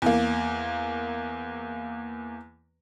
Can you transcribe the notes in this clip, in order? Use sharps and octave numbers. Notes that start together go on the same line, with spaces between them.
E2 A#3